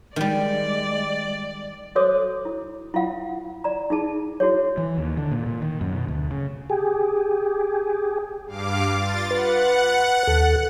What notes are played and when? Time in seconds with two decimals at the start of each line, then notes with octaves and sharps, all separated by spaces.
0.16 D#3 G3 G#3 D5
1.95 F#4 A4 C5 C#5 D6 D#6
2.45 E4
2.94 E4 F4 F5 F#5
3.64 D5 A#5
3.90 D#4 E4 G#4 A5
4.40 E4 F#4 G#4 C#5
4.78 E3
4.98 D#2
5.17 D3
5.31 A#2
5.46 A#2
5.62 D#3
5.81 F#2
5.92 B2
6.08 D2
6.31 C#3
6.70 G4 G#4
8.46 G2 F5 D6
8.96 F4 A6
9.31 B4 F#5
10.27 D#2 A4